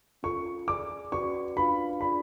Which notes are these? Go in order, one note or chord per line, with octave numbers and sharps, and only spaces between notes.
C#4 F4 A4 C#6
G#4 D5 G#5 D6
C#4 F#4 B4 D5 C#6
D4 F4 B4 F5 B5
D4 F4 G#4 D5 B5